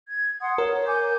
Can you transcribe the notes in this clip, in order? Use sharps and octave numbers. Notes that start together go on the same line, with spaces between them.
G#6
F#5 C6 D#6
A#4 C#5
G#5 D6 G6